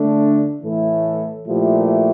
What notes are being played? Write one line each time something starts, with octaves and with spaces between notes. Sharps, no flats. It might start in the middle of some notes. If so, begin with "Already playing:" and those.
Already playing: D3 A3 D4
A2 E3 A3 E4 A4
A#2 F3 A3 E4 G4